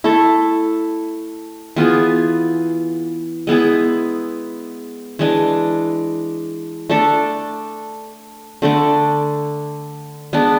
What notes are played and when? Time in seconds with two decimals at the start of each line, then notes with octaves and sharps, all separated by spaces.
0.04 A3 E4 A4
1.76 E3 B3 F4 G#4
3.47 G#3 B3 E4 G#4
5.19 E3 G#3 D4
6.89 A3 D4 A4
8.62 D3 A3 D4
10.33 G#3 B3 D4